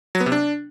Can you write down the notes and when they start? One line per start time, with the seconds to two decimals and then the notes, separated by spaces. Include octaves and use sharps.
0.15 F#3
0.20 B3
0.26 C3
0.32 D4